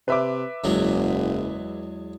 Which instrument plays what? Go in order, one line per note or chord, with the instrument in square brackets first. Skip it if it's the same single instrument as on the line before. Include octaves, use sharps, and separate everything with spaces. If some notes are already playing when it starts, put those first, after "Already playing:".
[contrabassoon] C3 [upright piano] B4 E5 D6
[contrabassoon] F#1 [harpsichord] E2 F#3 G#3